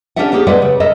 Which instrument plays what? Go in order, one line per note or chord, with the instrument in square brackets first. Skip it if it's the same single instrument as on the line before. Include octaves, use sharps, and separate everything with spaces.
[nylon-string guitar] C#4 D4 G4 A4 E5 F#5
A#3 C#4 G4 G#4
G#3 A4 B4 D5 E5 F#5
C#3
A4 A#4 D#5 E5